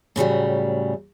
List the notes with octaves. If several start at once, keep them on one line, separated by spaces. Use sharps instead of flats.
A2 C#3 F#3 G3